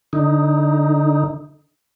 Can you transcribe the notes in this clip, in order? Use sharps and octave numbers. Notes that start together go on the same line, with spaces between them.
D3 D#4